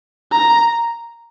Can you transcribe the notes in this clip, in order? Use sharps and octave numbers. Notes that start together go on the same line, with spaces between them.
A#5